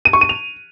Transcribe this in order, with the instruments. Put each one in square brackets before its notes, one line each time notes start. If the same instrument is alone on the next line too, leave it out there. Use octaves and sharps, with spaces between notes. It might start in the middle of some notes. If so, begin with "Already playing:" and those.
[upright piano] D#7
C#6
D#7
F7